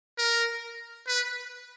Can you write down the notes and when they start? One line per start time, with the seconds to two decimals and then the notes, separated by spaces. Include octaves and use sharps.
0.18 A#4
1.07 B4